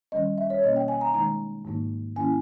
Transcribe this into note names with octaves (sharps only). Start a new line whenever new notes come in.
D#3 G3 C#4 D#5
E5
C#5
B2 A#3 C#4 D#5
G5
G#5
A#5
D#3 G#3 D#4 A#5
G#2 D#3 A#3 D#4
D#3 A#3 C#4 E4 G#5